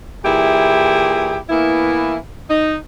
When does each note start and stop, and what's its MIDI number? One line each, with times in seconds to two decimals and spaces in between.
0.24 1.37 46
0.24 1.37 52
0.24 1.37 64
0.24 1.37 67
0.24 1.37 68
1.50 2.15 52
1.50 2.15 58
1.50 2.15 59
1.50 2.15 64
2.49 2.75 63